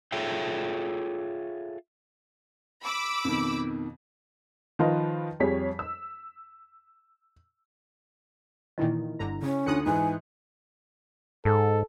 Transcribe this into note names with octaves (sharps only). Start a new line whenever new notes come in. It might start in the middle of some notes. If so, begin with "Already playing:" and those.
F4 G#4 A4 C#5 E5 G5
B5 D6 E6
F2 B2 D#3
D#3 F3 F4 B4 D#5
F2 G3 G#4 C#5 B6
E6
A#2 D#3 E3 E4 D#5
G1 D3 A#5
C#3 C#4
D2 D#4 F4 D#6 F#6 C#7
G#2 E3 G#5
G#2 A4